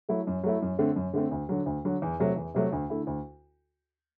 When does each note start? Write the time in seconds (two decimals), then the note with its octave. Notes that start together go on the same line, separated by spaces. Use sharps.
0.09 F#3 A3 E4
0.27 F#2
0.44 F#3 A3 E4
0.62 F#2
0.79 D3 A3 C4
0.96 F#2
1.13 D3 A3 C4
1.31 D2
1.49 D3 F#3
1.66 D2
1.85 D3 F#3
2.02 E2
2.20 C3 F#3 A3
2.36 E2
2.54 C3 F#3 A3
2.72 D2
2.90 D3 A3 E4
3.07 D2